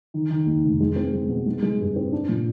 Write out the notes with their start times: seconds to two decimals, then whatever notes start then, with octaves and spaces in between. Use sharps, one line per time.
0.14 D#3
0.30 D#3
0.46 D#2
0.64 F1
0.80 G#3
0.96 C4
1.13 G#3
1.29 B2
1.46 G#3
1.62 G#3
1.80 G2
1.96 C4
2.12 D4
2.29 A#2